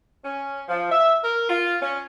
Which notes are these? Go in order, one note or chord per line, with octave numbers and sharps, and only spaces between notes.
C#4
F3
E5
A#4
F4
C#4